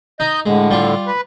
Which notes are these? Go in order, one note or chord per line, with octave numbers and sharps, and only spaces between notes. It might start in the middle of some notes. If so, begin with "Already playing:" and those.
D#4 D#5 G6
A2 D3 G#3
G3 F4
B4